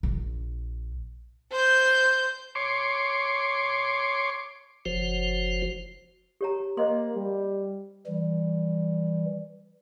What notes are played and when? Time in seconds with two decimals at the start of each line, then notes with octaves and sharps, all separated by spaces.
0.03 A#1
1.52 C5 G6
2.55 C#5 C6 D6
4.86 F#1 F3 F#4 C5
6.41 G4 C#5 A#5
6.77 A#3 C5 D#5 C6
7.15 G3
8.07 E3 G3